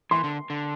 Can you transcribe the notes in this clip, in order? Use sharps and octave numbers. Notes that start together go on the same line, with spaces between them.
E3 C6
D3
D3